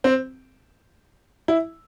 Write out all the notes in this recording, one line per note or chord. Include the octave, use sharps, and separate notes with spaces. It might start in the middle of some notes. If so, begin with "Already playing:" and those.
C4
E4